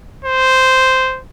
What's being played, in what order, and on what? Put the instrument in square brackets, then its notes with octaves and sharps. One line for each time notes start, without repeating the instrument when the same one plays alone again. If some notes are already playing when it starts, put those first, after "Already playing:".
[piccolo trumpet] C5